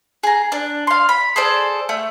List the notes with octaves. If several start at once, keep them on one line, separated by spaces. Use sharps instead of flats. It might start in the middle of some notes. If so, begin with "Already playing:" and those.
G#4 A#5
D4
F5 C6
B5
G#4 A4 C5 D5
A3